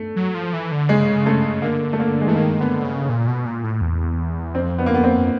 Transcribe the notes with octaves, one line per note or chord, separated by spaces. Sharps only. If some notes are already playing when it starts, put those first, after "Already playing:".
Already playing: A3
F#3
F3
E3
D3
C#3 G#3
A3
D3 A#3
A3
A#3
G#3
E3 A3
D#3 A#3
D3 B3
C#3
A#2
B2
A#2
A2
E2
F2 C4
B3
A#3
B3
C4